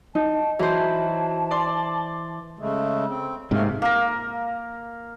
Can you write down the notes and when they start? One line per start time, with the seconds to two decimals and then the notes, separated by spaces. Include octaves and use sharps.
0.15 D#4 A5
0.59 E3 F#3 C5 A5
1.51 D5 C6
2.59 C#3 G#3 A3
3.09 C4
3.51 G#2 C3 A3 A#3 A#4
3.82 A#3 A#4